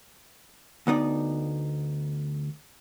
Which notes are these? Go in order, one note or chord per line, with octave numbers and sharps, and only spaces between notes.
D2 B3 D#4 D5